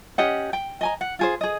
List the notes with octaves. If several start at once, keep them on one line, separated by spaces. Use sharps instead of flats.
C#4 G4 D#5 F#5
G5
D#5 G#5 A#5
F#5
F4 G#4 C5
G#4 D#5